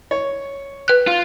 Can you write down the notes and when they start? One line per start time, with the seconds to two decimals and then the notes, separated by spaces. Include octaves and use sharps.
0.11 C#5
0.88 B4 F#6
1.07 F4